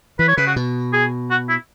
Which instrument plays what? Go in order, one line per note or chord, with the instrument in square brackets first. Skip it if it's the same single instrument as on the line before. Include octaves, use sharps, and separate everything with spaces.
[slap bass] E3 [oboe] B4
[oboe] C#5
[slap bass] C#3 [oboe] B4
[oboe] F#4
[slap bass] B2
[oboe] G#4
F#4
E4